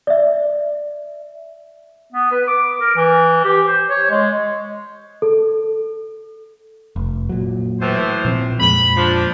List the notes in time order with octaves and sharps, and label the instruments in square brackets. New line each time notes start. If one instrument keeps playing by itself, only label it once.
[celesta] D5 E5
[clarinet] B3
B4
D6
A#4
E3
G4
C5
C#5
G#3
[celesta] A4
[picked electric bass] F1
A#2 F#3
[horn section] A2 E3 C5
[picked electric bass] A#2 F3 C4
[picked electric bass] F2 A#2 G#3 [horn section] B5
[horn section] F3 D4